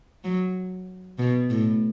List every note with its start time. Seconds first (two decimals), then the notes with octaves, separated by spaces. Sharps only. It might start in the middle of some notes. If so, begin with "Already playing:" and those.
0.24 F#3
1.19 B2
1.50 A2